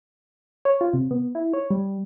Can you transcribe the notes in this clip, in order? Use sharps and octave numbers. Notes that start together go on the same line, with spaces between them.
C#5
F4
C3
B3
E4
C#5
G3